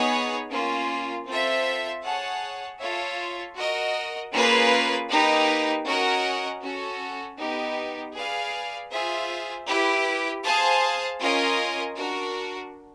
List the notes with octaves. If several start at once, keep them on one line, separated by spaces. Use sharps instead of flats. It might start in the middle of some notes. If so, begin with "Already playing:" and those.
Already playing: B3 D#4 G#4 C#5
A#3 C#4 F4
C4 F4 A4 C5 E5
G#4 C#5 F#5 A5
F4 A4 C#5 E5
F#4 A#4 D#5
A#3 C#4 F4 G#4 B4
A#3 D#4 G4 B4
C#4 F#4 A#4 D#5 F#5
C#4 F#4 A4
B3 D#4 G4
G#4 B4 D5 F5
F4 G#4 C5 E5
E4 G4 B4
G#4 C5 F5 A5
C#4 F4 A#4 D#5 G#5
D4 F#4 A#4